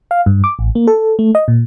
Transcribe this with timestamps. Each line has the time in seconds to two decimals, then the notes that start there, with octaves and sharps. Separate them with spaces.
0.11 F5
0.26 G2
0.44 D6
0.59 A1
0.75 A#3
0.87 A4
1.19 A3
1.35 D#5
1.48 A#2